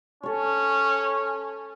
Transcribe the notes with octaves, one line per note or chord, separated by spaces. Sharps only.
C#4 A4 C#5